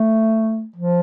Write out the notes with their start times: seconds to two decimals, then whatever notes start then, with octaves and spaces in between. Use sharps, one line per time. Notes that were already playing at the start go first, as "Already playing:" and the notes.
Already playing: A3
0.76 F3